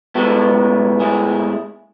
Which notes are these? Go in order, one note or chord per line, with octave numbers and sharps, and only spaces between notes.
A2 G#3 B3 F#4 A4
E4 G#4